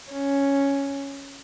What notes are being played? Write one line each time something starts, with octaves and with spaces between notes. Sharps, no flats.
C#4